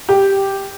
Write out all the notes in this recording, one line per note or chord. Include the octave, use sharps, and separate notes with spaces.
G4